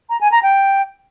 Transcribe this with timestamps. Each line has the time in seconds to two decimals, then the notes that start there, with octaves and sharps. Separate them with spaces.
0.10 A#5
0.21 G#5
0.32 A#5
0.43 G5